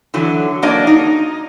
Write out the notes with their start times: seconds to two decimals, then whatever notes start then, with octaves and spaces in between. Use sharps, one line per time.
0.14 D3 E3 F#3
0.62 F#3 A#3 D4 G#4 D5 D#5
0.87 D#4